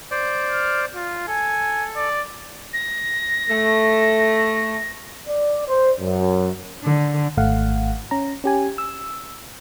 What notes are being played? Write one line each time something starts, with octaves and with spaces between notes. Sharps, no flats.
C5 D5
F6
F4
A4 G#5
D5
A#6
A3
D5
C5
F#2
D3
G#1 A3 F5 F#5
C#4 A#5
C#4 G4 G#5
E6